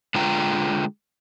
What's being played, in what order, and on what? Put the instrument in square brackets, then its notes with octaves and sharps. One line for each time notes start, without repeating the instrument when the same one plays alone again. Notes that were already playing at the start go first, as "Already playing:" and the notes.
[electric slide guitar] D3 G#3 F4 G5 A#5